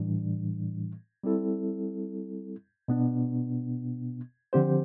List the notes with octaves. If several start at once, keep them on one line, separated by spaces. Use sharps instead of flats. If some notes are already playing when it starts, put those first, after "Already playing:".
Already playing: A2 E3 G3 D4
G3 C4 E4 A4
B2 B3 D4
D3 F3 C4 G4 C5